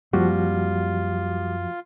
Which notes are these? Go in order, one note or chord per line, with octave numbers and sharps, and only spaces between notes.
F#2 F3 G3 A#3 C4 F4 F#4